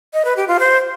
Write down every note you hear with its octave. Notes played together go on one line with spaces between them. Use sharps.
D#5
B4
G4
F4
C5